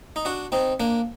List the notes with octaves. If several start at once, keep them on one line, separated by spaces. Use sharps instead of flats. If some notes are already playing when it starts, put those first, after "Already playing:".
D#4
D4 F#4
C4 D#4
A#3 D4